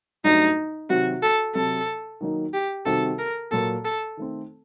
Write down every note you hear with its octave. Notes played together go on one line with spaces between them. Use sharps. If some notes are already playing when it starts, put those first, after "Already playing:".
G2 F#3 A3 D4 D#4 F#4
C3 D#3 F#3 C4 F#4
A4
C3 F#3 C4 A4
D#3 F#3 A#3 D#4
G4
C3 D#3 G3 C4 F#4 A4
A#4
A#2 F#3 A#3 A4
A4
D#3 A3 C4